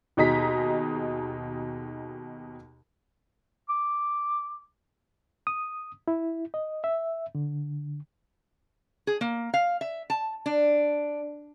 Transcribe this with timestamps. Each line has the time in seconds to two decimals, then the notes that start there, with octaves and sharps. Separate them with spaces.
0.17 D#2 B2 D#4 G#4 A#5 B6
3.69 D6
5.47 D#6
6.08 E4
6.54 D#5
6.84 E5
7.35 D3
9.07 G#4
9.21 A#3
9.54 F5
9.81 E5
10.10 A5
10.46 D4